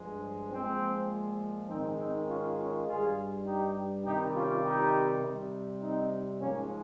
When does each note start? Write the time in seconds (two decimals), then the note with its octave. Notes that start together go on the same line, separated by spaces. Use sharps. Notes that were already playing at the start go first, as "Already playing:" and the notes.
Already playing: G2 F3 G#3
0.51 A#2 F3 G#3 C4
1.69 G#2 D#3 G#3 C4 D#4
1.98 C4 D#4
2.28 C#4 F4
2.58 C#4 F4
2.87 G2 G3 F4 G#4
3.46 D#4 G4
4.05 C3 D#3 G3 D#4 G4
4.35 C#4 F4
4.64 D#4 G4
5.22 C3 G3
5.82 C4 D#4
6.40 G#2 F3 G#3 A#3 C#4